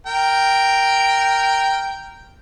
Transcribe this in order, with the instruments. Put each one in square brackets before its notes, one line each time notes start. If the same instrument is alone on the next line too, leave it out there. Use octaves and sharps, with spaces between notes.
[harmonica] A#4 G5